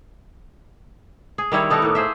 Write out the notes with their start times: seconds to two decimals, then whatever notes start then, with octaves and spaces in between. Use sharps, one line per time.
1.38 G#4
1.52 D#3 G3 E4 C#5
1.70 B3 D#4 A4 A#4
1.82 A2 A#3
1.95 G#4 C5 E5